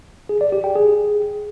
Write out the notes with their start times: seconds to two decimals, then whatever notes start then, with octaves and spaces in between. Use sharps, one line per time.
0.29 G#4
0.41 D5
0.52 G4
0.64 G5
0.75 G#4